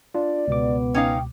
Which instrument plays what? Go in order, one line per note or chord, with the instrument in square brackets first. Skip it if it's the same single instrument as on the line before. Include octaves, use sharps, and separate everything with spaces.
[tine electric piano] D4 F4 [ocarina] D5
[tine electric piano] C#2 B2 D6 [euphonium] B3
[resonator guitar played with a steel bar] C#4 D#4 F5 [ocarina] G5